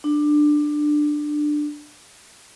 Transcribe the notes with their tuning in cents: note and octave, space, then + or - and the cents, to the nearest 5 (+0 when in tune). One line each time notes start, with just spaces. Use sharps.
D4 +15